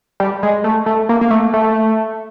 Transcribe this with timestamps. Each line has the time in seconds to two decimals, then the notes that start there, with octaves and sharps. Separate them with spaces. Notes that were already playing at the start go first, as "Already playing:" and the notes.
0.20 G3
0.43 G#3
0.64 A3
0.86 A3
1.09 A#3
1.21 A#3
1.31 A3
1.54 A3